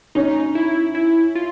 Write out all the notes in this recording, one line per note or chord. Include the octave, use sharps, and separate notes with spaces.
C#4 D#4
E4
E4
F4